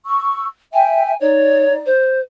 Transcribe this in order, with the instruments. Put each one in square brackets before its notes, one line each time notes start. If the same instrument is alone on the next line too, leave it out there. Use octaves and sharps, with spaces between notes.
[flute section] C#6 E6
[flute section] E5 G5 [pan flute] G#5
[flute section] D#4 D5 [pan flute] C#5
[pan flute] C5